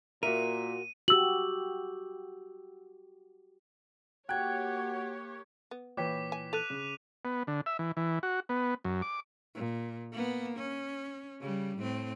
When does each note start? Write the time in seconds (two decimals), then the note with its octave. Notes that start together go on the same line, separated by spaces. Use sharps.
0.23 A#2 A#3 F#4 A#4 E5 D#7
1.08 F#4 G4 E6 F#7
4.29 A#3 F#4 G4 C#5 G5 F#6 G#6
5.71 B3
5.97 A#2 E3 B4 C#5 G5 D6 B6
6.32 G#5
6.53 A4 F#6 D#7 F7
6.70 C#3
7.25 B3
7.47 D3
7.66 E5
7.79 E3
7.97 E3
8.23 F#4
8.49 B3
8.85 F#2
9.02 D6
9.55 A#2
10.12 A#3 B3
10.57 C#4
11.41 C#3 G3
11.78 A2 C4